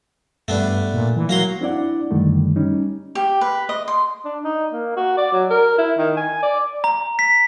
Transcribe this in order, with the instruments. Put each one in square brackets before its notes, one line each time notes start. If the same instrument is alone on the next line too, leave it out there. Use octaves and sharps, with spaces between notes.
[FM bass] G2 [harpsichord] A3 B3 D4
[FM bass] A#2
E3
[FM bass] F#3 [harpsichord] A#3 A#5 C6
[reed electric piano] C4 D4 E4 D5 F#5
F#2 D3 D#3 G3 A3
G3 C#4 D#4
[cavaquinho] G4
B4
D#5
C6
[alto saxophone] D4
D#4
A#3
F#4
D5
F#3
A#4
E4
D#3
G#5
D5
[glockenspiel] A#5
B6